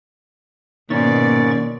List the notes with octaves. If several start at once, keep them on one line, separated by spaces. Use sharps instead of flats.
G#2 B2 D#3 A#3 C#4 D5 C#6 A6